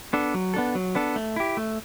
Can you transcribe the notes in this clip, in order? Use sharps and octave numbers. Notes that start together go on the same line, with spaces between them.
B3 D4 A4
F#3
B3 D4 A4
F#3
B3 D4 A4
A3
E4 G4
A3